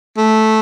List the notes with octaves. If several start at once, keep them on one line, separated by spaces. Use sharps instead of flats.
A3